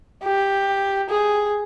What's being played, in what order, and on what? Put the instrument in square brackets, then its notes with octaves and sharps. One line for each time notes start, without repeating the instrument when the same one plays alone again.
[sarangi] G4
G#4